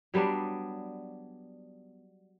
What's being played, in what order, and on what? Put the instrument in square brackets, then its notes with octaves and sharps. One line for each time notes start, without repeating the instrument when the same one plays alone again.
[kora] F#3 G3 B3 D4